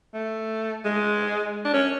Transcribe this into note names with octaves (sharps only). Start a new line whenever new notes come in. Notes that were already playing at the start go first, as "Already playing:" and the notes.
A3
G#3
D4
C#4